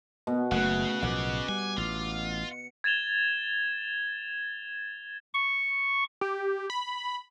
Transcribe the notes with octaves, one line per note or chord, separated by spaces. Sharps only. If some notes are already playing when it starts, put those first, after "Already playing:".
B2 B3
F#1 C#3 A3 F#5
B1 A2 F3 F#5 D6
G3 G#5
A1 F4
C#7
G#6 A6 E7 F7 G7
C#6
G4
B5